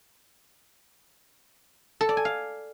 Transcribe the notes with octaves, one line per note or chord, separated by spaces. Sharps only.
A4
D5
G#5
F5